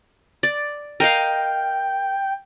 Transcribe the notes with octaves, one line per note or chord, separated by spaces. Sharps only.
D5
A#4 D#5 F5 G5